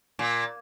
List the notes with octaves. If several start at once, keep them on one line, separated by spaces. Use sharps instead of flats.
A#2